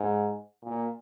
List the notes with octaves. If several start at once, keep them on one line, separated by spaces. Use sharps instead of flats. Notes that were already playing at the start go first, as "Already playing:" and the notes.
Already playing: G#2
A#2